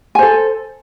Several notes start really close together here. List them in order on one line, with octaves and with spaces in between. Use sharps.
G#5 C5 A4